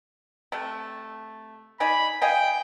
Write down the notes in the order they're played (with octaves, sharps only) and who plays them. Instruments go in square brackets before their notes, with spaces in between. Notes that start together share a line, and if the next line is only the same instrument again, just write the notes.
[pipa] C3 A3
[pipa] D#4 D5 G#5 [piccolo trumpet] B5
[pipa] D#5 F5 G#5 [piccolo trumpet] G5